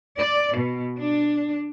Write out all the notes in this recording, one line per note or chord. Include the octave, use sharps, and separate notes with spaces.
D5
B2
D4